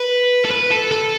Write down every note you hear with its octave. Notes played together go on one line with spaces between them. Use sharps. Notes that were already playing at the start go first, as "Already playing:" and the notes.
Already playing: B4
A4
B4
A4
A4